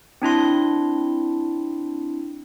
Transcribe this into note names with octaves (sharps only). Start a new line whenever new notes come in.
C4 D4 E4 C6